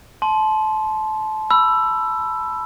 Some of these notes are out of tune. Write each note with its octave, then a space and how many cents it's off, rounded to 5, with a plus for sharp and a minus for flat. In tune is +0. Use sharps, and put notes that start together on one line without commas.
A5 -25 C6 +0
B5 +0 E6 +15